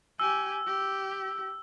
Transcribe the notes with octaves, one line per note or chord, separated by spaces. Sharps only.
G4 G#5 E6
G4